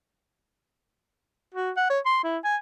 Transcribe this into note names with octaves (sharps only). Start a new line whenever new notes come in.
F#4
F#5
C#5
C6
E4
G#5